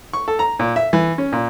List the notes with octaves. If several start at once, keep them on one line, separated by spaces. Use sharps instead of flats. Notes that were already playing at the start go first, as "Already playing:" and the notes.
C#6
A4
A#5
A#2
E5
E3
C#4
A#2